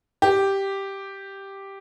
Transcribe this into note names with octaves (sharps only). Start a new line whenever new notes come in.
G4